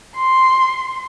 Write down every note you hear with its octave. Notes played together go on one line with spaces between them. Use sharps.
C6